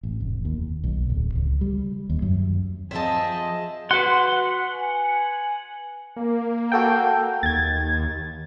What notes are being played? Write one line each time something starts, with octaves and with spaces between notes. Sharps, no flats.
A1
F1
D#2
B1
D1
C#2
G3
D#2
F#2
F3 C4 G#4 C5 D#5 E5 A5
F#4 B4 F#5 C6
G#5
A#3
F#4 A4 G5
D#2 G#6 A6